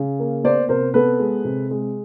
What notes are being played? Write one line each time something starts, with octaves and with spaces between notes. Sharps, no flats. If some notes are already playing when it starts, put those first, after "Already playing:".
Already playing: C#3
A#3
B3 C5 D5
C3 A#4 C5
B3 A4 B4
G#3
C3
G#3